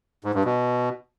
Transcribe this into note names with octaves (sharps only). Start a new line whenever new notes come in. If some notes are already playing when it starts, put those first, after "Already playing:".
G#2
G2
B2